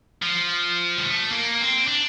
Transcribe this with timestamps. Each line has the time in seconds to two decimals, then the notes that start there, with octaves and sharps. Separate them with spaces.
0.22 F3
0.97 G3
1.05 A3
1.32 A#3
1.61 C4
1.87 D4